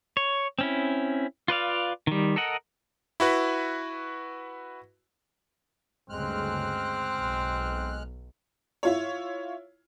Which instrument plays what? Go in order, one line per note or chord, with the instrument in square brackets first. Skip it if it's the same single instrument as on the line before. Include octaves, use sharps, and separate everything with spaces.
[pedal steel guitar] C#5
C4 C#4 E4
F4 B4 D5 F5
D#3 G3
A4 A#4 D#5 F#5
[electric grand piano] E4 F#4 B4
[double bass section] D2 G2 C#3 [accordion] G#3 F6 F#6 [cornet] C4
[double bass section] B1
[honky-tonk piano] E4 F4 C#5